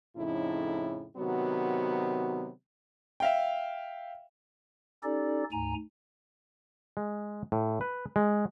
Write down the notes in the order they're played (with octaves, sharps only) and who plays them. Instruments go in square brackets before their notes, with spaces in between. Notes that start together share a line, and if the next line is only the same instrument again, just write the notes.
[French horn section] F2 A2 C#3 D#4 E4
C3 D#3 F#3 B3 F#4
[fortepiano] E5 F5 G5
[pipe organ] C#4 D#4 G4 A4 D5
D2 G#2 G#5 A#5
[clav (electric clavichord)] G#3
A2
B4
G#3